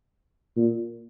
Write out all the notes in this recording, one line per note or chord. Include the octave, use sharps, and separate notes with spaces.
A#2